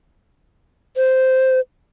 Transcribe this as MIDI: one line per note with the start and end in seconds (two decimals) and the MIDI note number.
0.97 1.60 72